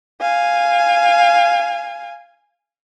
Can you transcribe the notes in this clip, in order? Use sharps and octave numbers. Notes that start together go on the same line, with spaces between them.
F5 G#5